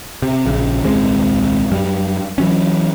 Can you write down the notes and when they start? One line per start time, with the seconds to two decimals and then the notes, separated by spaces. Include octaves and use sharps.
0.22 C3
0.46 A#1 C#3
0.83 D#1 C2 G#3 C4
1.71 F#2 G3
2.38 E3 F#3 C#4